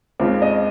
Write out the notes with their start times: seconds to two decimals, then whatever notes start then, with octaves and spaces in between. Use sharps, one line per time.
0.20 D#2 C#3 G#3 C4 F4
0.42 D#5